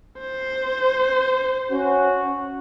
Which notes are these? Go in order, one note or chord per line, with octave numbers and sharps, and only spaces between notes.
C5
C#4 F#4